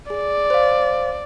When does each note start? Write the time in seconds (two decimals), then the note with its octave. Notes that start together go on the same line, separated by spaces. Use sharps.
0.10 G#4 D5
0.50 C5 F5